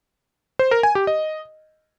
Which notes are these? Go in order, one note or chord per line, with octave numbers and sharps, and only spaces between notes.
C5
A#4
G#5
G4
D#5